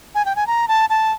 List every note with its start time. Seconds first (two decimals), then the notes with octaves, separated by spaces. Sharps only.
0.15 G#5
0.25 G5
0.36 G#5
0.47 A#5
0.68 A5
0.90 A5